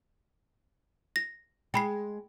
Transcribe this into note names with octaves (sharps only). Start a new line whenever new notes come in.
A#6
G#3 G5 B5 C7